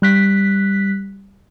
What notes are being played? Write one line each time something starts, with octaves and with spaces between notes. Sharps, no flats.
G3 F#6 B6